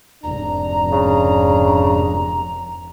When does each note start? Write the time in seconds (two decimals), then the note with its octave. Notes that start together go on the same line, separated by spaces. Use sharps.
0.24 F1 G#2 D4 A#5
0.92 C#3